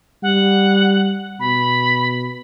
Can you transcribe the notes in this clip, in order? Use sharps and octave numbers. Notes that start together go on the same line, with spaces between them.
G3 F#5
B2 B5